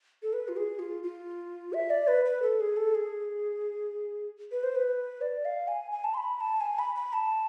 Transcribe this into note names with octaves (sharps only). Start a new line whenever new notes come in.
A4
B4
F4
G#4
F4
F4
E5
D5
B4
B4
A4
G#4
A4
G#4
B4
C5
B4
D5
F5
G#5
G#5
A5
C6
B5
B5
A5
G#5
B5
B5
A5